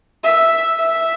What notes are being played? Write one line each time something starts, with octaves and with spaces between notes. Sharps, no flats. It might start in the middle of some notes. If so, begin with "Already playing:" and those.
E5
E5